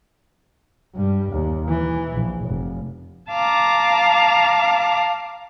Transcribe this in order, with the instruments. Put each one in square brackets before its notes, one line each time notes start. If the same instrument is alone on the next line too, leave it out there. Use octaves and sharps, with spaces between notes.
[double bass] G2 G3
D#2
E3
A#1
F1
[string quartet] F5 A5 A#5 D6